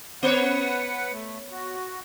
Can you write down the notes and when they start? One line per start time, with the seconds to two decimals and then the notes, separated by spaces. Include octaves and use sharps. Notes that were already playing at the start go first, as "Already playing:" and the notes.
0.23 B3 B4 C#5 F#5
1.12 A3
1.51 F#4